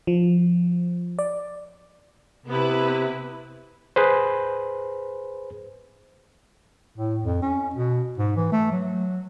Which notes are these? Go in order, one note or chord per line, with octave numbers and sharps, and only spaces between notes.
F3
D5
C3 B3 E4 B4
G#4 B4 C5
A2
F2
C#4
B2
G#2
E3
A3
F#3